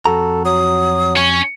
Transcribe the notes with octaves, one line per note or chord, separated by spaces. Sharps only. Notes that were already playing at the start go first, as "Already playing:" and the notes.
F2 F#4 A4 A#5
F#3 D#6
C#4 C#6